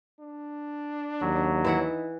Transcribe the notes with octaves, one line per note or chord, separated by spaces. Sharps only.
D4
D#2 F#3
E3 D#4 E4 F#5